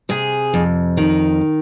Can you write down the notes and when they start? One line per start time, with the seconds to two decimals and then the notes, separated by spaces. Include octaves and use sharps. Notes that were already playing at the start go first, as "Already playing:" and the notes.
0.09 C3 G#4
0.54 F2
0.97 D#3